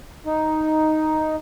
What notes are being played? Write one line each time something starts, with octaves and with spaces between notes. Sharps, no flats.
D#4